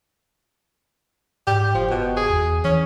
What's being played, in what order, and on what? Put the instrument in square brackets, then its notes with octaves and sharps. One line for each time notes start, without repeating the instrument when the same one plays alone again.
[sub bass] G#2 [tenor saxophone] G4
[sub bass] F#1 [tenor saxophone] F3
[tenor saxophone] B2
G#4
[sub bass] E2
[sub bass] E3 [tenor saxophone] C#4